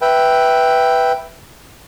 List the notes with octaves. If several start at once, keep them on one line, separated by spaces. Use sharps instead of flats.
B4 E5 G5